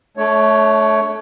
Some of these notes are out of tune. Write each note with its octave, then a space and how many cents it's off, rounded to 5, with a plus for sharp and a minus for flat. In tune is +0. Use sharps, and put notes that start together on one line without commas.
A3 -20 D4 +0 C#5 +5